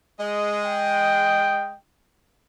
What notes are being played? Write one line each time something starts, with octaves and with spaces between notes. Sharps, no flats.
G#3 D#5
G5